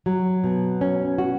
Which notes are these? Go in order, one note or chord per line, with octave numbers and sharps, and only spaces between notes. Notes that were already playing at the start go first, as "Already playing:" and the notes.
F#3
B2
C#4
F#4